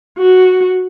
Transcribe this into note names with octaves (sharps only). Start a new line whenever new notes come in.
F#4